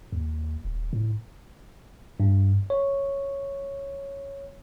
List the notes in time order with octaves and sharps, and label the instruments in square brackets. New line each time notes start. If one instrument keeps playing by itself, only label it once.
[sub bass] D#2
D#1
A2
[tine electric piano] G2
C#5